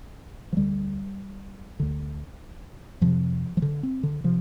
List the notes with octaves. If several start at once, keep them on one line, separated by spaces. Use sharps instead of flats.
F3
D2 D3 G3
D2 D3
F2 C3 F3
F3
D3
C4
D3
C3 F3